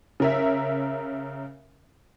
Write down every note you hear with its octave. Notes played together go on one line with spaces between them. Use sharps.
C#3 A#4 E5